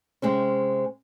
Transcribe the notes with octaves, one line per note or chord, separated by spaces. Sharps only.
C3 G#3 C4 C#4